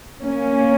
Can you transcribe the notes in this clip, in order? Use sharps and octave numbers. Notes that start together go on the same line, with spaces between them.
A#3 C#4